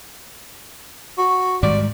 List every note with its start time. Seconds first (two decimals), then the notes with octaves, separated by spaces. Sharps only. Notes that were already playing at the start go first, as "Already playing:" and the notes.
1.18 F#4
1.63 G#2 D#3 G3 D5